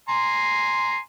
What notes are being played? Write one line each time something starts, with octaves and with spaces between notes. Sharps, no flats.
G#5 A#5 C6